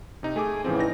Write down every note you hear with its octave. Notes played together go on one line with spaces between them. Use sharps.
C3 D#4
A3 G#4 G#5 D6
A2 C#3 E3 F3 C4
D#4 D5 A#6